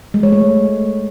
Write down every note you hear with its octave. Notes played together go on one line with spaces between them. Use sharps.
G#3
C#5
A3